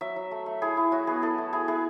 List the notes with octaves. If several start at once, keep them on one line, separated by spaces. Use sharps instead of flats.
F#3 E5
F#3
A3
A3
E4 G#4
E4
F#3 F#4
B3 G#4
E4 A4
A3
E4 G#4
E4 G#4